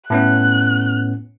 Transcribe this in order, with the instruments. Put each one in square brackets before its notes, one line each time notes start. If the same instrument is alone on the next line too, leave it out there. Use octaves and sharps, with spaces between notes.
[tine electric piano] A2 B3 C#4 [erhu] F#6